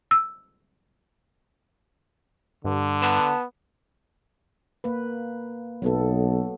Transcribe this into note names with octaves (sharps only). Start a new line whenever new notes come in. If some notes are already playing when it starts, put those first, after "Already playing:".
E6
G2 D3
B3 A5
A#3 B4
B1 F#3 B3 A4